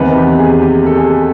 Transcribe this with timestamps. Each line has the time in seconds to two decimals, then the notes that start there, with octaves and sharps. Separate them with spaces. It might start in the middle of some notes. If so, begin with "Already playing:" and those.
Already playing: E2 C3 D#3 B4
0.15 G4
0.39 G#4
0.62 G4
0.86 A4
0.97 G#4